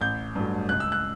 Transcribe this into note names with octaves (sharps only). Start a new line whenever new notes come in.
A1 G6
G2 F#3 A3
C#2 F#6
E6
F#6